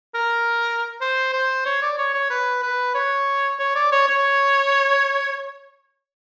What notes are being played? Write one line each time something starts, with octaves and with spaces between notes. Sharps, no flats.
A#4
C5
C5
C#5
D5
C#5
C#5
B4
B4
C#5
C#5
D5
C#5
C#5